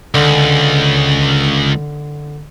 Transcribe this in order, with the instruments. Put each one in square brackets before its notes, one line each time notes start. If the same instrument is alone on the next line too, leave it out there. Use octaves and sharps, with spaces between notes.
[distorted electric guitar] C#2 [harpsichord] D3